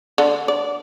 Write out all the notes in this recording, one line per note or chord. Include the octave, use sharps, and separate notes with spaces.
D3
D5